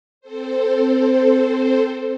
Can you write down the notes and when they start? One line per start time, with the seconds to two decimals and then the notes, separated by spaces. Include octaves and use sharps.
0.21 C4 A4 C5